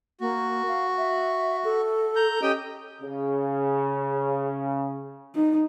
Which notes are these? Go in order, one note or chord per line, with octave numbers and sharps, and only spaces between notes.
A#3 F#4
F5
E5
A4
A#5 G6
C#4 G4 D#5 G5
C#3
D#4